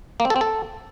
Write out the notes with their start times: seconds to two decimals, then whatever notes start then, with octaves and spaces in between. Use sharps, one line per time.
0.20 A#3
0.25 C4
0.30 A4
0.36 C4
0.41 A4